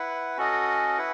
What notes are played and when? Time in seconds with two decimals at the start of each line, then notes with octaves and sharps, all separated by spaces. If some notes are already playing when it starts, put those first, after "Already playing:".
Already playing: E4 B4 F#5
0.37 C#4 F#4 A4 D#5
0.98 E4 B4 F#5